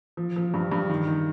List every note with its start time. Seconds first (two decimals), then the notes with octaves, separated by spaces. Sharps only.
0.17 F3
0.36 F3
0.54 G2
0.72 G2
0.90 D#3
1.07 D#3